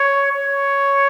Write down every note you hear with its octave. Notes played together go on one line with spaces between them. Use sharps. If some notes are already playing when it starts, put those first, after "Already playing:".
Already playing: C#5
C#5